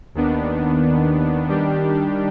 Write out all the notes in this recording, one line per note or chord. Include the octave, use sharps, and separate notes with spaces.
D#2 D#3 B3 D4
D#3 G3 D4 G4